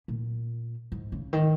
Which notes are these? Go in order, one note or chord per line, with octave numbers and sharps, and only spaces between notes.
A#2
G#2
C#3
D#3